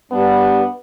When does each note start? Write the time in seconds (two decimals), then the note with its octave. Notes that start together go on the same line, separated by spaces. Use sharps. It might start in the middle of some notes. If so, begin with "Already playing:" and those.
0.11 G2 G3 B3 D4